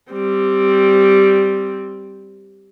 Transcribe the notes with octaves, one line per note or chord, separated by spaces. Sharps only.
G3 C4